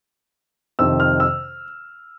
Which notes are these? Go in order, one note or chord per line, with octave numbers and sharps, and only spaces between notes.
F2 C3 D#3 E6
F6
E6